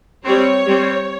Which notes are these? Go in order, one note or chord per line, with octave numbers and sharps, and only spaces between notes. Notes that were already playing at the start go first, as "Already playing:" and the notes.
G3 C4 C#5
G3 C4